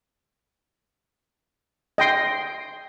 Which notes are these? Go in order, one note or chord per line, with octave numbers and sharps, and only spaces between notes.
D#5 G5 C6